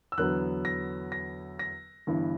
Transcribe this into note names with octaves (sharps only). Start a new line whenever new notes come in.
E6
E2 D3 F#3 B3 F#6
A#6
A#6
A#6
G1 G2 E3